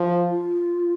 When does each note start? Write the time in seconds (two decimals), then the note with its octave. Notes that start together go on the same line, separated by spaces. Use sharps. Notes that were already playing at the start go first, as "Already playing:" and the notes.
Already playing: F3
0.30 F4